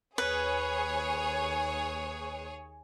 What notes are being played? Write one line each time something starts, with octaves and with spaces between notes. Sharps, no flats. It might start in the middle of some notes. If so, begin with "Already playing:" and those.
D#2 G#4 B4 C#5